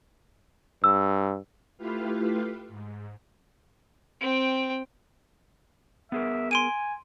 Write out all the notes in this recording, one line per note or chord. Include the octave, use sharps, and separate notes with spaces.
G2 E6
A3 E4 F4 G4 B4 F5
G#2
C4 G5
B3 G#4 A#4 E5
G#5 C6 D7 D#7